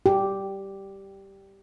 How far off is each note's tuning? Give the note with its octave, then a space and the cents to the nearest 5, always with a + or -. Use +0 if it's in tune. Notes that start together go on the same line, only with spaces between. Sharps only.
G4 -5